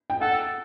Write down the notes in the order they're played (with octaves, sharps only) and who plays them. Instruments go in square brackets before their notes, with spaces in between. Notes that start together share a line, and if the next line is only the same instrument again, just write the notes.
[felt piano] G5
[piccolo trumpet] A4 [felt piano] F#5